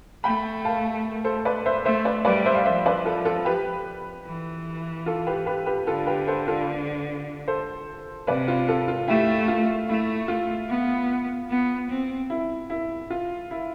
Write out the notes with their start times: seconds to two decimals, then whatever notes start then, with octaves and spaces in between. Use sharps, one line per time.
0.24 A3 G5 B5
0.65 F5 A5
1.24 A4 C5
1.45 B4 D5
1.66 C5 E5
1.85 A3 C5 E5
2.05 B4 D5
2.25 G3 B4 D5
2.46 C5 E5
2.55 F5
2.65 F3 C5 E5
2.86 B4 D5
3.05 F4 A4
3.25 F4 A4
3.45 G4 B4
4.26 E3
5.06 F4 A4
5.27 G4 B4
5.46 G4 B4
5.66 G4 B4
5.86 D3 F4 A4
6.07 G4 B4
6.28 A4 C5
6.48 F4 A4
7.48 A4 C5
8.27 C3 B4 D5
8.48 F4
8.69 F4 A4
8.88 F4
9.08 A3 E4 G4
9.48 F4
9.89 A3 E4
10.28 F4
10.69 B3
11.50 B3
11.89 C4
12.30 E4
12.70 E4
13.10 F4
13.51 E4